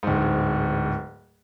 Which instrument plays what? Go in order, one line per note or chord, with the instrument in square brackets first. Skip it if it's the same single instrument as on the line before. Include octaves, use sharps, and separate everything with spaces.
[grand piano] D1 G#2